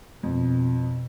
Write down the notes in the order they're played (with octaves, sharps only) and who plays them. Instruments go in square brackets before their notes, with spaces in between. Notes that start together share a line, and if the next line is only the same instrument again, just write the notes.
[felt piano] F2 [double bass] B2